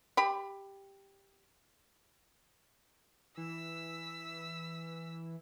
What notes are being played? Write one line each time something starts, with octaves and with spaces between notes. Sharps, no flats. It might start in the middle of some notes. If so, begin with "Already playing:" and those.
G4 B5
E3 E6 B6